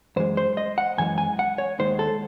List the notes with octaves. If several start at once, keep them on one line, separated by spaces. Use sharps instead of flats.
F#2 E3 G#3 C5
C5
D#5
F#5
F#2 E3 G#3 G#5
G#5
F#5
C#5
D#2 D#3 G#3 C5
A4